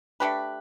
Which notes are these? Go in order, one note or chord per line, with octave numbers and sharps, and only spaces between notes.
A3 D4 G4 B4